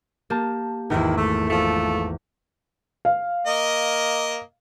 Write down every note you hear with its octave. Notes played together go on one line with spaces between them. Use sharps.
A#3 G4 A5
G#1 E2 D#3 E4
A3
F3 A3
F5
A#3 D#5